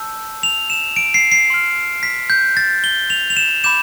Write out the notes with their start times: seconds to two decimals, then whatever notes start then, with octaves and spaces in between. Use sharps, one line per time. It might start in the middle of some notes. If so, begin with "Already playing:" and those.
Already playing: A5 E6 G6
0.43 F7
0.70 E7
0.96 D7
1.14 C7
1.32 C7
1.50 C6 F6
2.03 B6
2.30 G6
2.57 A6
2.84 G7
3.10 F7
3.30 F7
3.37 E7
3.64 B5 D6 G6 E7